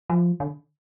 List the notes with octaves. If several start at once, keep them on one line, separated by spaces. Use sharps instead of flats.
F3
D3